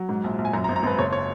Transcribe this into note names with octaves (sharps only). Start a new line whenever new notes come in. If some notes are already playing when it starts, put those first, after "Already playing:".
Already playing: F#3
G#2
A#1
A#1
G#5
F#2 A#5
A#5
G#1
A#5
G#1 B4
F#1 C#5
C#5